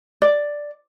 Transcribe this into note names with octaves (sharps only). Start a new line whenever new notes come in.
D5